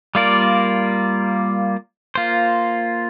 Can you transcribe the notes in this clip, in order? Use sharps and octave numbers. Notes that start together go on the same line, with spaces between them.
G3 A#3 F4 A#4 D5
A#3 F4 C5